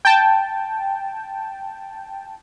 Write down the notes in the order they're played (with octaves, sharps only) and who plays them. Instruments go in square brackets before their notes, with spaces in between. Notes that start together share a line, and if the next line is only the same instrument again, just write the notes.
[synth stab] G5 A5